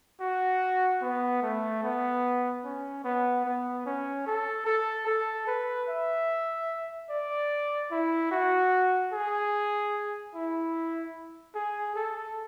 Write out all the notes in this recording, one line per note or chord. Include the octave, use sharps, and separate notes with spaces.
F#4
B3
A3
B3
C#4
B3
B3
C#4
A4
A4
A4
B4
E5
D5
E4
F#4
G#4
E4
G#4
A4